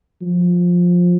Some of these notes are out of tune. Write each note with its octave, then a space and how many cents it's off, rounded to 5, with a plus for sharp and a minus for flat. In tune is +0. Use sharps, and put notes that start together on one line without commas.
F3 +15